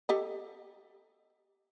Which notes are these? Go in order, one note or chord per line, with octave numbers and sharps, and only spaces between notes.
G4 A4 D#5